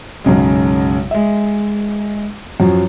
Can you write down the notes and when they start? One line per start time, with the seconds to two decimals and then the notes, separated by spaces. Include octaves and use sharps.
0.24 B1 F#2 C#3 G#3
1.11 G#3 E5
2.60 F#2 F3 F#3